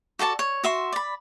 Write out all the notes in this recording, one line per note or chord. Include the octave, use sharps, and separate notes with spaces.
F#4 A4 D5 A5
C#5
F#4 E5 C6
D5 B5